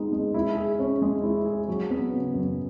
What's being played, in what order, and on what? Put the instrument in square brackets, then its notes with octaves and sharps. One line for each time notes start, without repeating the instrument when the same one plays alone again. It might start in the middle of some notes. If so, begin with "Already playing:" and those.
Already playing: [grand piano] G#3 B3 D#4
G#3
E4
G#4
C#4
G#3
E4
G#4
F#3
B3
C#3
F#2